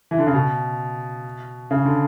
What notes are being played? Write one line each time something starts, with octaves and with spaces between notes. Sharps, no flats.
E3
D3
C#3
B2
C#3
D3